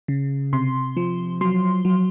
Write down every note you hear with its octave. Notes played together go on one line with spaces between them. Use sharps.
C#3
C3 C6
F3
F#3 C6
F#3